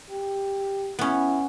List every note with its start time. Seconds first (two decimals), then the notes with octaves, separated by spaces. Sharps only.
0.10 G4
0.99 B3 C#4 E4